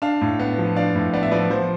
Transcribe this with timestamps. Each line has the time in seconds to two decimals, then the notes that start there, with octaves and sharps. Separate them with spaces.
0.02 D4 F5 A5
0.21 A2
0.40 B3
0.58 F3
0.76 D4 D5 F5
0.95 A2
1.14 B3 D5
1.23 E5
1.31 F3 B4 D5
1.50 F3 C5